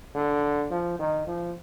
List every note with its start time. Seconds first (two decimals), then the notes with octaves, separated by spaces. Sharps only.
0.15 D3
0.71 F3
0.99 D#3
1.27 F3